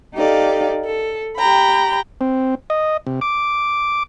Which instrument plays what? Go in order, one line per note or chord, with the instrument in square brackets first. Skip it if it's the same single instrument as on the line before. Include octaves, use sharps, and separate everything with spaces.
[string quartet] D#4 G4 A4 D5 F5
A4
G4 G5 A#5 B5
[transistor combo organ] C4
D#5
C3
D6